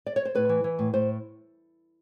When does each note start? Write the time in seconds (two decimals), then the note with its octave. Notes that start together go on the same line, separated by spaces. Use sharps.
0.06 D5
0.16 C#5
0.25 C5
0.35 A2 B4
0.49 E3
0.64 E3
0.79 A2
0.94 A2 C5